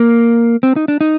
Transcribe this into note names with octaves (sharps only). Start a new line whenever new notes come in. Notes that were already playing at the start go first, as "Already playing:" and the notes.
Already playing: A#3
C4
D#4
D4
D#4